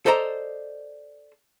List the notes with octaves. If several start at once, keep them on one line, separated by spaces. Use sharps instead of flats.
A4 C5 D5 D#5 A#5